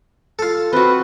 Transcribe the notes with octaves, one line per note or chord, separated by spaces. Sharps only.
F4 A4
C4 F#4 B4